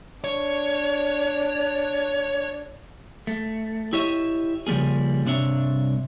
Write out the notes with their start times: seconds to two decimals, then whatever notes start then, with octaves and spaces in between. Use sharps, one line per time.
0.24 D4 C#5
3.27 A3
3.93 E4 G4 C#5 D#5 E5
4.67 C#3 F3 G3 A#3 G#4
5.25 C2 G2 C3 D4 C#5 E5